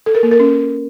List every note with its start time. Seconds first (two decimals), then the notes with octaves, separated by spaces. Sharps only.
0.06 A4
0.15 A#4
0.23 A#3
0.31 A#4
0.40 C#4